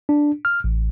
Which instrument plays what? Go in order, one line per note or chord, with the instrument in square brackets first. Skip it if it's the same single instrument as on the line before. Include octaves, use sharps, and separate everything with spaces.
[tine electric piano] D4
F6
A1